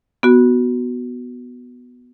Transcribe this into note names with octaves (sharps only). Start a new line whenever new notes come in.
B3 F#4